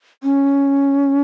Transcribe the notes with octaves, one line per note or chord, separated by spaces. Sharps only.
C#4